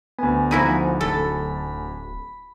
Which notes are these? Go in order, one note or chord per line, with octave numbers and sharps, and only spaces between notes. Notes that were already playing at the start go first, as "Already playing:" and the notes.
D2 B3 G#5
F3 D#4 E4 F#4
D1 A4 B5